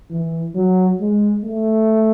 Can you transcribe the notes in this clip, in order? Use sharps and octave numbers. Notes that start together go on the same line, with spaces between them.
E3
F#3
G#3
A3